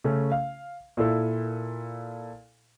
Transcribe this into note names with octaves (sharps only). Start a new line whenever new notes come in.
C#3 A3 C#4
F5
A#2 E4 A4